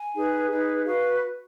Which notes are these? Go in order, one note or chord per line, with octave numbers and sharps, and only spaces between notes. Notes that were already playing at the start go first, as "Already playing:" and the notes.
Already playing: G#5
D#4 G#4 B4
D#4 G#4 B4
F#4 B4 F5